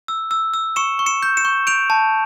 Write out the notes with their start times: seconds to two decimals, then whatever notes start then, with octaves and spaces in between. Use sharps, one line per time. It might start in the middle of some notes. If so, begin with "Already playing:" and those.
0.08 E6
0.31 E6
0.54 E6
0.76 C#6 C#7 E7
0.99 C#6
1.06 C#7 E7
1.23 G6
1.37 C#7 E7
1.45 C#6
1.67 G6 D7 F7
1.90 A5